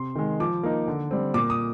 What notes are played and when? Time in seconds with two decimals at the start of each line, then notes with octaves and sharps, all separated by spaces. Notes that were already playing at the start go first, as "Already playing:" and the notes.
Already playing: C3 C6
0.15 D#3 G#3
0.40 F3 D6
0.63 A#3 D#4
0.88 D3
1.11 G3 C4
1.34 A#2 D6
1.50 D#6